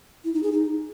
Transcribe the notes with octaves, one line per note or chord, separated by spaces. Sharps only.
E4
D#4
G#4
D#4